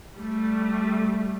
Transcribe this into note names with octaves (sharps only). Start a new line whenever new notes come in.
G3 A3